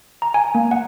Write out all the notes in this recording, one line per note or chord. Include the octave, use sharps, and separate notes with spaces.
A#5
G#5
A#3
F#5